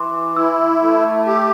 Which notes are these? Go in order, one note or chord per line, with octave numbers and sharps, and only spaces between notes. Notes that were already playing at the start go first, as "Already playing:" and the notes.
Already playing: E3 C6 D6
E4 E6
A3
G4